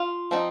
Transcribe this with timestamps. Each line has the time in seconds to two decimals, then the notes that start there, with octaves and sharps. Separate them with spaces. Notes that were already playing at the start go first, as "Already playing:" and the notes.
Already playing: F4
0.31 F3 C4 D#4